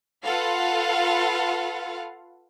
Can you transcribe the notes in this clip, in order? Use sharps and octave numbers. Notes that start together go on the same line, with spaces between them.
F4 A4 B4 F5 F#5